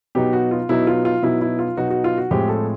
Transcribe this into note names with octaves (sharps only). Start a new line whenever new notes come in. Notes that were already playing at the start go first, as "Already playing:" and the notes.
B2 F#3 B3 D#4 G4
F#4
F4
B2 F#3 B3 D#4 E4
F4
F4
B2 F#3 B3 D#4 E4
E4
F4
B2 F#3 B3 D#4 F#4
F#4
F4
F#4
A2 F3 G#3 C4 G4
A4